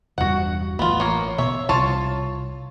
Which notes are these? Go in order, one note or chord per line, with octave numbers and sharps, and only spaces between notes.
E1 G2 F#4 F#5
A1 B3 F4
A#3 C#5
B2 C#5 E5
C2 F4 C#5 A5